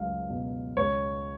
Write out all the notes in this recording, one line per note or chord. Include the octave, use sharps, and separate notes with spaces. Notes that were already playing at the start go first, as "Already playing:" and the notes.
Already playing: C#2 F#3 F5
B2
C#2 C#5